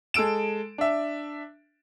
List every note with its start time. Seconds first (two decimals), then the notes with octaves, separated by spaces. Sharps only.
0.14 G#3 A4 E6 D7 E7
0.78 D4 E5